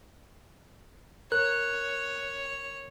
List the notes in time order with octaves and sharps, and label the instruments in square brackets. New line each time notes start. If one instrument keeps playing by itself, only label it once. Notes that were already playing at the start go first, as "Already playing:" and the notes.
[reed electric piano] A#4 [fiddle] C#5 [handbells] F#6